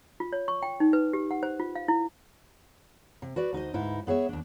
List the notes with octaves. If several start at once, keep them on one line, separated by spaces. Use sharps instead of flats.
F4
C#5
C#6
G5
D#4
B4
G4
F#5
C5
F4
F5
E4
C3
F#4 B4 D5
D2 D#4 C5 D#5
D2 G#2 D#4 E4 B4
B3 G#4 C#5 E5
D#2 D4